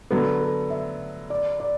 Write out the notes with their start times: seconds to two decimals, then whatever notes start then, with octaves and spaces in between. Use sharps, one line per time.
0.11 D3 F#3 B3 A4
0.41 A4
0.70 E5
1.30 D5
1.60 D5